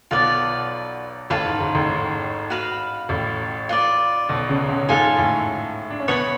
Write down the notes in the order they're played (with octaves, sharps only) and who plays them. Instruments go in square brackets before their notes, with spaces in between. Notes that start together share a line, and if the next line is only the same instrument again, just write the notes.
[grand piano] B1 B2 [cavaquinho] F4 B4 D5
[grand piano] A1 A2 [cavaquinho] B4 F5 A5
[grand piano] G#2
G#2
A1 A2
G#2
[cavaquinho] F#4 B4 F5 B5
[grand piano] A1 A2
[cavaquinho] F4 B4 D5
[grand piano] B1 B2
C#2 C#3
C#2 C#3
[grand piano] G#2 G#3 [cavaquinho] F4 A4 F5 G#5
[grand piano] A2 A3
D4
C#4
[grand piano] B2 B3 [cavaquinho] C#5 F#5 B5